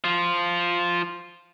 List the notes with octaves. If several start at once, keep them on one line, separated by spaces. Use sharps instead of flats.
F3 F4